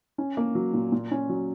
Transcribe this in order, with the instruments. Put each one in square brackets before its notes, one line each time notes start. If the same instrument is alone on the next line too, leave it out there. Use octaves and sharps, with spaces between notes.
[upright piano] C#4
A#3
F#3
A#2
A#2
C#4
F#3